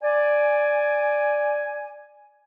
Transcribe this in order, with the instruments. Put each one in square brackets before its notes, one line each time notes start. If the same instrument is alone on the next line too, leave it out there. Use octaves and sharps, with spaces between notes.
[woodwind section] D5 G#5